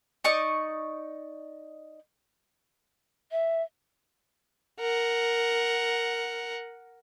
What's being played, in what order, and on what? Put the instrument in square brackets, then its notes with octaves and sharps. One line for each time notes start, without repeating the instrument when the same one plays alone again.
[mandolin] D#4 D5 C#6 D#6
[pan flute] E5
[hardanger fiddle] A#4 F#5